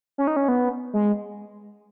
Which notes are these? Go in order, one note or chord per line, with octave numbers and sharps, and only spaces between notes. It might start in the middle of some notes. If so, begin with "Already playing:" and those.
C#4
D#4
C#4
B3
G#3